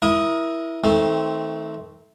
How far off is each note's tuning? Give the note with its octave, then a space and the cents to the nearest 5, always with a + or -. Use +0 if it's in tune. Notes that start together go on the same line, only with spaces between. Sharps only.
E4 +0 A#4 +30 D#5 +0
D#3 +35 A3 +0 C4 +0